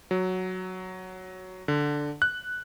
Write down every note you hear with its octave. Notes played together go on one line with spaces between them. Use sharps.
F#3
D3
F#6